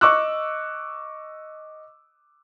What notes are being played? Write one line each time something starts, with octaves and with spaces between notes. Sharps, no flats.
D#5 C#6 D6 E6 F#6